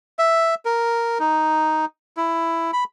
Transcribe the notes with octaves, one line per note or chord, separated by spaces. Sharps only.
E5
A#4
D#4
E4
B5